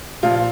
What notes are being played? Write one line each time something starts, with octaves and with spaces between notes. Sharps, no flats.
A#2 F3 F4